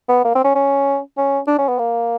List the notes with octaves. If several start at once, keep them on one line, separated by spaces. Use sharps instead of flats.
B3
A#3
C4
C#4
C#4
C#4
D4
C#4
B3
A#3